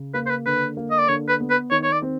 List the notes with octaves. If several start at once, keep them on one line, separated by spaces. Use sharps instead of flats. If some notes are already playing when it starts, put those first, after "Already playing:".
Already playing: C#3
A#3 B4
C5
B4
D3 B4
A#3
D#5
D5
D3 C#5
B4
B3
B4
D#3 C#5
C#5
D5
C4